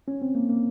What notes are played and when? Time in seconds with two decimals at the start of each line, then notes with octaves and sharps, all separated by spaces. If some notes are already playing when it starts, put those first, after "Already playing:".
0.08 C#4
0.22 C4
0.35 A#3
0.49 A#3